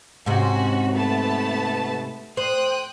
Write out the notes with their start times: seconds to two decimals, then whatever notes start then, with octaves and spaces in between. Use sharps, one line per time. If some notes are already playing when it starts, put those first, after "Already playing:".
0.26 G#2 C3 C#4 F#4
0.92 A3 B3 A5
2.37 C5 G5 D#6 F#6